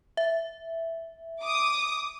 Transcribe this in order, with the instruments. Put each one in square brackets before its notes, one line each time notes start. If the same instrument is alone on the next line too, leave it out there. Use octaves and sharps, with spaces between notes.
[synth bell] E5
[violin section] D6 D#6